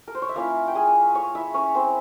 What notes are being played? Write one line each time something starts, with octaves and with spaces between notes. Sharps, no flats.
A#4
C5
C#5
E5
A#3 C#4 E4 F4 F5
G5
G#4 G#5
C#5 C#6
E4 E5
C#4 C#5
C4 C5